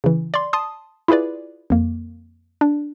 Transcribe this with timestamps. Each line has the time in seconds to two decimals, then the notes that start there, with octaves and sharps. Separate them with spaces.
0.04 C#3 E3
0.34 D5 C6
0.53 A5 C6 D#6
1.08 E4 F4 G#4 B4 D5
1.70 F2 A#3
2.61 D4